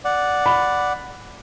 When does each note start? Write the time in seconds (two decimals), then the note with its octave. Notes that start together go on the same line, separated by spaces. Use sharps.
0.05 D5 F#5
0.46 B5